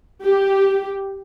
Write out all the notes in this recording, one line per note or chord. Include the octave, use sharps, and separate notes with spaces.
G4